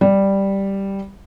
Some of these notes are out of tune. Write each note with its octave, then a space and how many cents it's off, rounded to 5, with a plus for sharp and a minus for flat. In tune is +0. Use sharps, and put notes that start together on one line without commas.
G3 +0 G4 +0